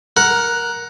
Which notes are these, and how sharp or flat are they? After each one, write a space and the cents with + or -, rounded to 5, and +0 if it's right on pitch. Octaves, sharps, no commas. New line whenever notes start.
A#4 +10 F#5 +0